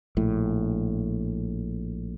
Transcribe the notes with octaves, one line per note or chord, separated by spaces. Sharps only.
A#1 A2